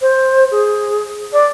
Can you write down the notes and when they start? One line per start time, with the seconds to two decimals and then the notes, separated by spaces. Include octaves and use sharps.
0.01 C5
0.51 G#4
1.33 D5